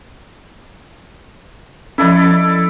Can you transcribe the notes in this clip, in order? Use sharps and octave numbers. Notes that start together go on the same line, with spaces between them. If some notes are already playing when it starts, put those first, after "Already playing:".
F3 C#4 E4 A4 D5